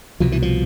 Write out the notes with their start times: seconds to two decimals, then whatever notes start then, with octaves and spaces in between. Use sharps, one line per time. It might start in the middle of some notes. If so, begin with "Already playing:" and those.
0.20 C2 B2 F3
0.32 E3
0.42 F3